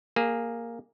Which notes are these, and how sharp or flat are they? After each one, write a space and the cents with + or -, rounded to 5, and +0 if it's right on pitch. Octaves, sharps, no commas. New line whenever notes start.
A#3 +0 G#4 -15